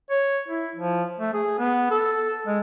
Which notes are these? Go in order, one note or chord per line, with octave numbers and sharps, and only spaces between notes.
C#5
E4
F3
A3
G#4
B3
A4
G#3